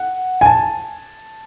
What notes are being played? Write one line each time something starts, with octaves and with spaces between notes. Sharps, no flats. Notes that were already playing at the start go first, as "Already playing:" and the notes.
Already playing: F#5
G#5
A5